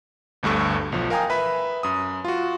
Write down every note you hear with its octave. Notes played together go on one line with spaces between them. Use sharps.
G1 D2 G2 A4 C#6
B1 F3
A#4 F5 G5 G#5 A#5 D#6
B4 E5 B5
F#2 D#6
F4 F#4